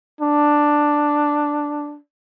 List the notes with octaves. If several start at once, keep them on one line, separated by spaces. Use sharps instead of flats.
D4